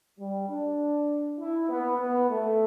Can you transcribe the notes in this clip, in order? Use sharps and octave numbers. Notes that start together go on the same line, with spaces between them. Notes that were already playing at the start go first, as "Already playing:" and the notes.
G3
D4
E4
B3
B3
A3